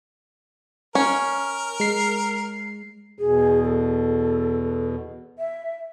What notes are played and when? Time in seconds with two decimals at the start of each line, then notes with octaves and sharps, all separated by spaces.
0.95 C#4 A#4
1.80 G#3 C7
3.19 E2 B2 G#4
3.64 A4
5.39 E5